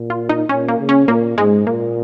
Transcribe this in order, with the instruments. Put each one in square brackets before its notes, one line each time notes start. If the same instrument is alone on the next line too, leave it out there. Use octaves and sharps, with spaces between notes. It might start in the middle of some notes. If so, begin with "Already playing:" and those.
Already playing: [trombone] A#2
[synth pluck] F4
D#4
[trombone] A#2 [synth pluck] C#4
[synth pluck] A#3
[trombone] C#3
[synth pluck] C#4
[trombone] A#2 [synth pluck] A#3
[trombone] G#2 [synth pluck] G#3
[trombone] A#2 [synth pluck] A#3